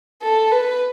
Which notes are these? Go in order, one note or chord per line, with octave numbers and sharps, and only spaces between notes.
A4
B4